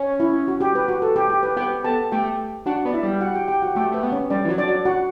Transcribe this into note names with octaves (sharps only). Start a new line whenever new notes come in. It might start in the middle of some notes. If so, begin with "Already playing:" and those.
Already playing: C#4
E4
F#4
G4
B4
F#4
A4
G4
G4
B4
B3 G4 G5
B3 A4 A5
A3 G4 G5
D4 F#4 F#5
B3 D5
E4 E5
G3
F#4 F#5
G4 G5
G4 G5
F#4 F#5
A3 G4 G5
A3 B4
B3
C#4 C#5
G3 D4 D5
E3
F#3 C#5
D4 D5
F#3
F#4 F#5